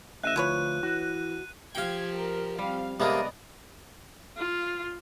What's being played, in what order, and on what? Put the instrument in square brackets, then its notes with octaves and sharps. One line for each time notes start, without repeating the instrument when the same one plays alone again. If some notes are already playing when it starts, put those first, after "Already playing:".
[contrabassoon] A1 [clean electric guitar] D#5 E5 [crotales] F#6 D#7
[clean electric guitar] D2 [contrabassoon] F3 [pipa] E4 B4 C#5
[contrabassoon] E3 [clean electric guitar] F#4
[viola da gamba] F3 G4 [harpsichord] F5 G5 [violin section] G#6
[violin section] A#4
[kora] G3 [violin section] C4 F5
[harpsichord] C3 G#3 A#3 [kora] B3 D4 [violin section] D5 D#5 A#5
[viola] F4